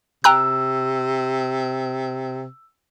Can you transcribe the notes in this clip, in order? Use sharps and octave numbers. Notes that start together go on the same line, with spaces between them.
C3 G5 A#5 E6 F#6